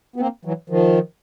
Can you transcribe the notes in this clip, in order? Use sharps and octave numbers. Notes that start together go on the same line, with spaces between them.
B3
A#3 C4
E3 F#3
D#3 F3